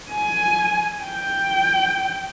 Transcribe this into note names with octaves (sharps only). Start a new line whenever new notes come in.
G#5
G5